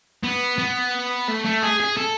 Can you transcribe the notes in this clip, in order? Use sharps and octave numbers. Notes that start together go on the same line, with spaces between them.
B3
B3
A3
A3
G#4
G#4
A4